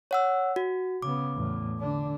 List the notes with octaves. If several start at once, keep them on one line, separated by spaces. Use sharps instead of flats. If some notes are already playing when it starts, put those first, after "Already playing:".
C#5 F#5 E6
F#4
C#3 B3 D6
E2 A2
D3 D4